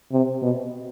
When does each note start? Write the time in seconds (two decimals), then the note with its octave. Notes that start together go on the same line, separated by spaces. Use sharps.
0.12 C3
0.42 B2